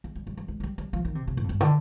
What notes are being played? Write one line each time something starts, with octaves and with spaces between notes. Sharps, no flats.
G#3
G3
G3
G3
G#3
G#3
G3
G3
F3
D#3
C3
C3
G#2
F2
G2
D3